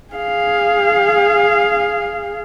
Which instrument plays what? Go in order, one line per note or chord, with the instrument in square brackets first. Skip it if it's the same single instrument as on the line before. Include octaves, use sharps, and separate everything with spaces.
[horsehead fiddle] G#4 F5